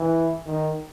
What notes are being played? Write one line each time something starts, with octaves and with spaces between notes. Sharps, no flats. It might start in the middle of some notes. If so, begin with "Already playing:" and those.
Already playing: E3
D#3